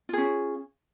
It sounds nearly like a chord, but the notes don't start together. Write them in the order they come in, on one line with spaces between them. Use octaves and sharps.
F4 G#4 C#4